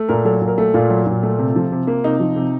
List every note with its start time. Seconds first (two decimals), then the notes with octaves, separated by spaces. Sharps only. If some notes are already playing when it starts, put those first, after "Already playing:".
Already playing: A3
0.09 A#2 A#4
0.25 F#3 A4
0.41 A#2
0.48 A#4
0.58 A3 A4
0.74 A#2 F4
0.90 F#3
1.07 A#2
1.23 A3
1.39 C3
1.56 F3
1.72 C3
1.87 A#3
2.04 C3 D#4
2.20 F3
2.36 C3